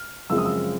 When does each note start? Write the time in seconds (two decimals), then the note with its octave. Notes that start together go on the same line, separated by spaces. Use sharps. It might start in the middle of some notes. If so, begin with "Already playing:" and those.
Already playing: F6
0.30 F#2 C#3 F3 G#3 C4 E6
0.38 D#6
0.45 E6